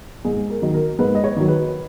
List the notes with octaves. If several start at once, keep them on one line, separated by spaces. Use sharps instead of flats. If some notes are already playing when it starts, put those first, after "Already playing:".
G#2 G#4
A#4
D#3 F#3
A#4
G#2 B4
D#5
C#5
D#3 F#3
B4